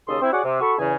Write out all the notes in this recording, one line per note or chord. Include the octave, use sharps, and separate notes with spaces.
D#2 C#3 A4 C6 D#6
C4 E4
F#4 G#4 C#5 D5 F#5
C3
F#4 A4 B5 C#6
E2 C#3 G#5